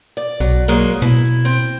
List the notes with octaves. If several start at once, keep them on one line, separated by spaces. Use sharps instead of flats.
D5
B1 F#3
F#3 G#3 A#3
B2 E4
C4